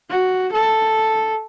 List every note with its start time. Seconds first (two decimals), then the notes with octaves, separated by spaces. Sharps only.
0.10 F#4
0.53 A4